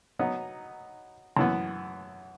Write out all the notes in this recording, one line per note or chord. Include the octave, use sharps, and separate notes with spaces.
F#3 B3 D#4
F#2 E3 B3